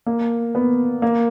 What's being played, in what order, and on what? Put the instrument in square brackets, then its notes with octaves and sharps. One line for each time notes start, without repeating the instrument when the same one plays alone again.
[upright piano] A#3
B3
A#3